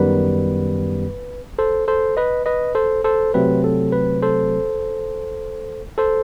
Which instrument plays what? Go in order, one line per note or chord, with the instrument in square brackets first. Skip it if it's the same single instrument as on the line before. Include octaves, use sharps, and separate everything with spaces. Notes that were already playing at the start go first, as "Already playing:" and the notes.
Already playing: [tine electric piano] F#2 D#3 G3 B3 B4
A4 C5
A4 C5
B4 D#5
B4 D#5
A4 C5
A4 C5
C3 F#3 A3 C4 B4
A4
B4
A4 C5
A4 C5